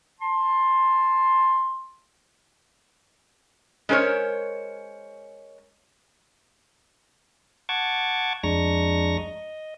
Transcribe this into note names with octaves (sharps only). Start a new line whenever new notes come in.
A5 C6
G#3 C#4 A#4 C5 C#5
F#5 A5 C#6 D6 G#6
F2 G#3 D4 A#5 C#6 A#6
D#5